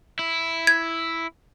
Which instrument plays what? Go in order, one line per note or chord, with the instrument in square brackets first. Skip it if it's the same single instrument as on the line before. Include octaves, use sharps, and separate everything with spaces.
[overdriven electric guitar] E4
[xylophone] G#6